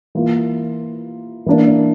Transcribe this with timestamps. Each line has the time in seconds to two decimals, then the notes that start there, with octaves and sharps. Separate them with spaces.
0.15 E3 A#3 F4
1.46 E3 A#3 D4